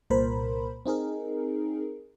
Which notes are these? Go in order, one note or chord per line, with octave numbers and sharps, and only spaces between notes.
C2 A#2 A#4 C5 B5
C4 D#4 G#4 A#4